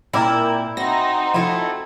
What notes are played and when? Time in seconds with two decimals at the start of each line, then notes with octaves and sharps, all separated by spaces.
0.13 A#2 C4 E4 A#4 D5 G5
0.77 C4 D#4 F#4 A#6
1.34 F3 A3 E4